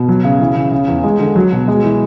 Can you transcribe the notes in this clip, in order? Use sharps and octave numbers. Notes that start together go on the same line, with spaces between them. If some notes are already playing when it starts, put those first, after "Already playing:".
Already playing: B2
F#3
C#3
E3
C#3
C#3
E2
G#3
D3
F#3
B2
G#3
E3